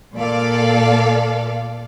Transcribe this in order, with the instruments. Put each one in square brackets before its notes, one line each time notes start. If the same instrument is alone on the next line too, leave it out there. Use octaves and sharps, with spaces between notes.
[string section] A#2 A4 D5 F5